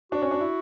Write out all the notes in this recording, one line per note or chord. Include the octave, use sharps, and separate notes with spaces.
D4 F#4
C#4
D4
E4